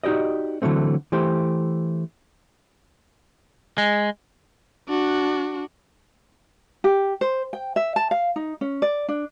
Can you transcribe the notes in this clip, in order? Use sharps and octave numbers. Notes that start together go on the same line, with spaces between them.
D#4 F#4 G4 D5 D#5
D3 E3 F#3 A3 C4
E3 A3 G4 C5
G#3
D4 F#4
G4
C5
G5
E5
A5
F5
D#4
C#4
D5
D4